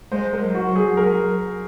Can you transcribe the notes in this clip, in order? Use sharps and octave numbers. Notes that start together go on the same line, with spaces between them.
G#3 C5
A#4
F#3
F#4
F#3
G#4
F#3 A#4